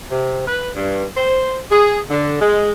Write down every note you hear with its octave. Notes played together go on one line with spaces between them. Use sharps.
C3
B4
G2
C5
G#4
D3
G#3